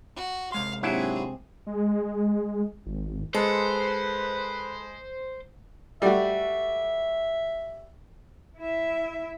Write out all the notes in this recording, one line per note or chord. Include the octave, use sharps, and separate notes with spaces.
F#4
C3 G#3 F5 C6
G#2 F#3 A#3 C4 D4 E4 G4 G#4
G#3
G#1
G#3 A4 B4 C5
G3 A3 F#4 E5
E4 E5